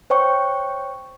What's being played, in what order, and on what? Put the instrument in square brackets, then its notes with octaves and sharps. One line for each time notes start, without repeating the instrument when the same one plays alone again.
[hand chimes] C5 C#5 G5 C#6